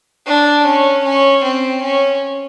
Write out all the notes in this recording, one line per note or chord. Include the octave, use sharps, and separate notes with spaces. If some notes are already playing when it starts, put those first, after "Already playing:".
D4
C#4
C#4
C4
C#4